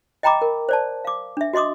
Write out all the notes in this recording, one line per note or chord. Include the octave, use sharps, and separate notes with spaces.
D#5 G5 A#5 B5 D6
A#4
C5 D5 A5
F5 D6
D4 E5
F#4 D#5 C6 D6 D#6